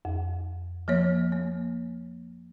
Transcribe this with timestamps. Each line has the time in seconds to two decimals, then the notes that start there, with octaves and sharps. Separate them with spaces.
0.05 F2
0.88 F3 A#3 C#5
1.32 A#3